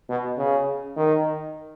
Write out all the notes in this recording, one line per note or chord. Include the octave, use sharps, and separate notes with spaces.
B2
C#3
D#3